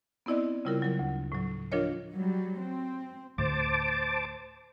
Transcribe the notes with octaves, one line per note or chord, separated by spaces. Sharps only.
B3 C4 E4 D5 D#5
C#3 G3 E4 F4 A#4
F#3 A#4
D2
A2 F#3
F3 D4 F4 A#4 C#5 D#5
F#3 G3
C4
D2 A2 C5 A5 D6